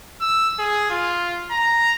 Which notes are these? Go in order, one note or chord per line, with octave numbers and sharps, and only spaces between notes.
E6
G#4
F4
A#5